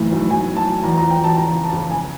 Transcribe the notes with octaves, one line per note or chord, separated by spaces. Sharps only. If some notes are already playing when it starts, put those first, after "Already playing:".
Already playing: F#1 A2 E3
B1
B1 G#5
A2
A5
F#3
E2 A#5
F3 A#5
G5
E2 A5
C#3 A#5
F2
A5
C#3
C#3 G#5